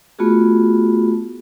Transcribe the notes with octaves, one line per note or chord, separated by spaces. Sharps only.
A3 B3 F4 F#4 G#4